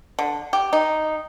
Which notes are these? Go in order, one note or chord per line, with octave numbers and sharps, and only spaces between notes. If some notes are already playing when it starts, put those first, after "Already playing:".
D3
G4
D#4